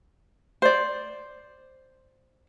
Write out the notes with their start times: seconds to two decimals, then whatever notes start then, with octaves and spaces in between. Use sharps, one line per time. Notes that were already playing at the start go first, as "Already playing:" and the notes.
0.62 C5 D5